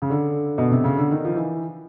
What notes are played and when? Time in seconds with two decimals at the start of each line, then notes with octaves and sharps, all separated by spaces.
0.02 C#3
0.10 D3
0.58 B2
0.71 C3
0.84 C#3
0.97 D3
1.10 D#3
1.25 F3
1.36 E3